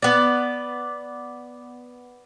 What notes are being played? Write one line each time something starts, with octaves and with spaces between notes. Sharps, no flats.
B3 D5